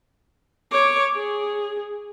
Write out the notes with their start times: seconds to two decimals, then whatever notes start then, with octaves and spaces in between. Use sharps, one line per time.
0.71 C#5 D6
1.16 G#4